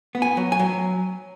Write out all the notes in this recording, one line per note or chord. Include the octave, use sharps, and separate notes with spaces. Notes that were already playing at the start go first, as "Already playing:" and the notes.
B3
G#5
F#3
G#5
F#3